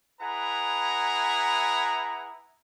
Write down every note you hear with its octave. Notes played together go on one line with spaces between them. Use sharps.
E4 G#4 B4 F#5 A#5